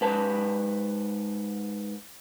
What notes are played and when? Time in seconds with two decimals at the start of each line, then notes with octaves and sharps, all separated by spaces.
0.01 G#2 B4 A5